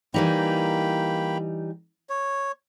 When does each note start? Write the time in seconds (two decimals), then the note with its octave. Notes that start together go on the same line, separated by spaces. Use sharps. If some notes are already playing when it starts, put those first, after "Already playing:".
0.14 E3 G3 A#3 D#4 G5 B5
2.09 C#5